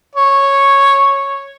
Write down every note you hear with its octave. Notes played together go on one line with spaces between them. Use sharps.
C#5